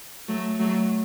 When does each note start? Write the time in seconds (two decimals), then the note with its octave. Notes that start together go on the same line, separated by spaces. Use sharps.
0.28 F#3 A3
0.59 F#3 A3